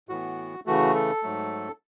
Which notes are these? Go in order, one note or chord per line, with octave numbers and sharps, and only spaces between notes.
A2 E3 B3 F#4
C#3 E3 A3 F#4
A4
G#2 F#3 A3